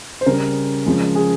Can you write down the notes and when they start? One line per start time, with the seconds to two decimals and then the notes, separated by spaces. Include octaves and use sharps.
0.21 C5
0.26 C#3 G3 A#4
0.86 C#3 F3 G#3
1.15 G#4